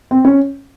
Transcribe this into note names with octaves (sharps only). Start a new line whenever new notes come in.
C4
C#4